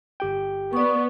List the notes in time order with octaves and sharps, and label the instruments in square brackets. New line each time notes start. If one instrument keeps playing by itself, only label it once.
[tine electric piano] G1 G4 G5
[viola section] B3 [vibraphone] D5 C#6